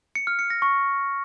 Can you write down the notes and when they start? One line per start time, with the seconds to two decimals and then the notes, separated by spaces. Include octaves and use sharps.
0.15 C#7
0.27 F6
0.39 C#7
0.50 A#6
0.62 C#6